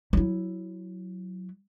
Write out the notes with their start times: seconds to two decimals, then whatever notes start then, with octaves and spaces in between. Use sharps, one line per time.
0.13 F#3 E4